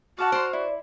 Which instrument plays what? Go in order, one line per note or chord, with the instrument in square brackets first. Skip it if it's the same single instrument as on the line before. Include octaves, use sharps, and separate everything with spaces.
[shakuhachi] F#4 [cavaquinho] F#5 A5 D6 [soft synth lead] F6
[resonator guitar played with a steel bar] C5 [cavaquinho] D5 C6
[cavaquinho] E4 [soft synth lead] D5